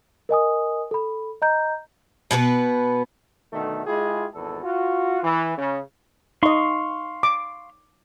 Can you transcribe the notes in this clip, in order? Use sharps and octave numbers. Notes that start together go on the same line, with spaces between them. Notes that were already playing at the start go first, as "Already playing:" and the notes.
A#4 D#5 G#5 D#6
A4 B5
D#5 A#5 G6
B2 B3 G#4 B4
B2 D3 D#3 A3
G#3 E4 F4 G4 G#4
G#1 E2 A4
F4 F#4
E3
C#3
D#4 D#5 F5 C6 C#6
D6